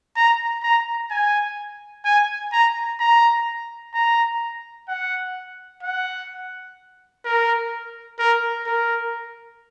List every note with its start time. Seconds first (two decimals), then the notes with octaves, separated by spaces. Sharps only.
0.16 A#5
0.63 A#5
1.10 G#5
2.05 G#5
2.52 A#5
3.00 A#5
3.94 A#5
4.88 F#5
5.83 F#5
7.25 A#4
8.19 A#4
8.66 A#4